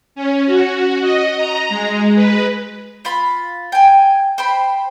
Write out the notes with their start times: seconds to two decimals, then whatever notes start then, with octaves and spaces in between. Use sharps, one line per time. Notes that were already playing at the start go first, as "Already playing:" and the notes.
0.15 C#4
0.46 F#4
1.01 D#5
1.38 A#5
1.69 G#3
2.15 B4
3.05 F4 B5
3.72 G5 G#5
4.38 C5 G5 B5